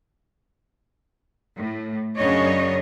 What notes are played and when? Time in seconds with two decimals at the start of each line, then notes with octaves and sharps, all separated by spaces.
1.57 A2
2.17 F#2 C#3 D4 C#5 D#5